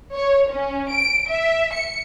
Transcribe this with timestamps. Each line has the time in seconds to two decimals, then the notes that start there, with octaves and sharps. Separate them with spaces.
0.14 C#5
0.51 C#4
0.92 D7
1.30 E5
1.73 C#7